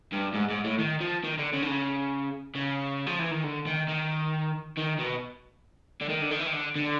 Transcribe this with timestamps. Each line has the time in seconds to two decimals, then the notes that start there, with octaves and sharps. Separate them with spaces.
0.12 G2
0.34 G#2
0.50 G#2
0.64 A2
0.79 D#3
1.00 F3
1.24 D#3
1.38 D3
1.53 C#3
1.62 D3
1.67 C#3
2.55 C#3
3.07 F3
3.19 E3
3.31 D#3
3.44 D3
3.67 D#3
3.88 D#3
4.77 D#3
4.99 B2
6.01 D3
6.09 D#3
6.21 D3
6.31 D#3
6.39 E3
6.47 D#3
6.53 D3
6.75 D3